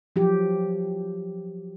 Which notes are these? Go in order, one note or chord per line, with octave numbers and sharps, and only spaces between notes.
F3 F#3 G4